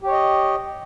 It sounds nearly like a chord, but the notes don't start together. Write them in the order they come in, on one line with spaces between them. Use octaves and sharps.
G4 C#5 D#5